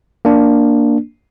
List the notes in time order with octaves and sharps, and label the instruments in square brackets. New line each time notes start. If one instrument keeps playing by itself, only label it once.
[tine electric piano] A#3 D4